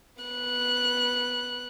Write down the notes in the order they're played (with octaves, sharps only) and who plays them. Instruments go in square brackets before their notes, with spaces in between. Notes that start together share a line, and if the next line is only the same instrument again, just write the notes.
[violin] B3 F#6